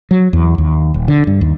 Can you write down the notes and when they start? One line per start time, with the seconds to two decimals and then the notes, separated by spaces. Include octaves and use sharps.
0.11 F#3
0.33 E2
0.58 D#2
0.94 D#1
1.08 D3
1.27 G2
1.41 D#2